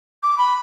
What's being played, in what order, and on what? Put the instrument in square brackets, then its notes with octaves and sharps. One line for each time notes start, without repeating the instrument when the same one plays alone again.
[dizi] D6
B5